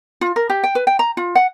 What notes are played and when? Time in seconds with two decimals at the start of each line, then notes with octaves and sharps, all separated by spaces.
0.21 F4
0.36 A#4
0.50 G4
0.64 G5
0.75 B4
0.87 G5
0.99 A#5
1.17 F4
1.35 F#5